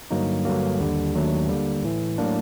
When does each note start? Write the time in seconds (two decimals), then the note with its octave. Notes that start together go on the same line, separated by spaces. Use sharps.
0.11 G2 D3 F#3 A#3 D#4
0.45 G2 D3 F#3 A#3
0.79 D#2 D3 G3
1.14 D#2 D#3 F#3 A3 D4
1.49 D3 G3 A#3
1.84 A2 E3 A3
2.18 A2 F#3 A#3 D4